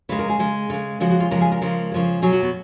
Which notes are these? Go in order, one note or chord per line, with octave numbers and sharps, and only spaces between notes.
C#3 G#3 B4
A#4
G#4
C#3 G#3
C#3 G#3
C#3 F3 G#3 F#4
F#4
F4
C#3 F3 G#3 A#4
G#4
A#4
C#3 F3 G#3
C#3 F3 G#3
B2 F#3 G#4
F#4
B3